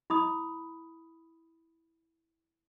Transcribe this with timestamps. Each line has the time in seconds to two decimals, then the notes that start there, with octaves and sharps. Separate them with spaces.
0.10 E4 B5 D#6